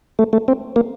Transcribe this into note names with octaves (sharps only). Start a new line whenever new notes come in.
A3
A3
C4
A#3